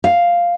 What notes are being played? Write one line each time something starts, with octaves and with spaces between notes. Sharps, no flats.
F5